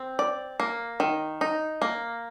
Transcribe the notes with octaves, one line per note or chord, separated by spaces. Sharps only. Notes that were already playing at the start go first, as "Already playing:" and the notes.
Already playing: C4
D5
A#3
D#3
D#4
A#3